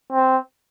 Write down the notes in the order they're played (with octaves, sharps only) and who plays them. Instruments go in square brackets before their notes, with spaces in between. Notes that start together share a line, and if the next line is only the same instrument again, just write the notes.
[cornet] C4